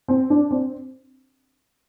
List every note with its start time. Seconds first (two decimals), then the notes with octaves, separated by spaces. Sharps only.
0.08 C4
0.30 D4
0.51 C4